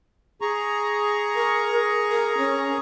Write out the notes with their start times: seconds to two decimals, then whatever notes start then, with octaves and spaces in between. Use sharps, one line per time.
0.41 G#4 A#5 C#6
1.35 A#4
2.10 A#4
2.38 C#4